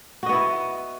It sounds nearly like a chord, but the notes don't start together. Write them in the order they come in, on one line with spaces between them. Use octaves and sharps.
F#4 D#5 B3 E4